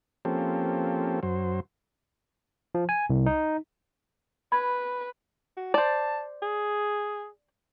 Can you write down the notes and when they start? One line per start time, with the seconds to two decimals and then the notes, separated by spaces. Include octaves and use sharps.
0.25 F3 A#3 C4 C#4 G4 A4
1.23 F#2 F#3 C5
2.75 F3
2.89 G#5
3.10 C2
3.26 D#4
4.52 B4 B5 G#6
5.57 F#4
5.74 C5 D5 A5
6.42 G#4